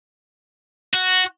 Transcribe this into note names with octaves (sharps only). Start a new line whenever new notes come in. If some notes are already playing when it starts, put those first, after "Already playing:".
F#4